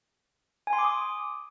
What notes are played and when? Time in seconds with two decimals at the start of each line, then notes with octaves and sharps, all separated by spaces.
0.67 G#5
0.73 C6
0.79 D6
0.84 D#6